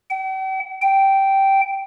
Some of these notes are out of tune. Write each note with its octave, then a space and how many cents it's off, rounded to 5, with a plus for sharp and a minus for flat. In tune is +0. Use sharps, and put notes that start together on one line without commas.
G5 -45
G5 -10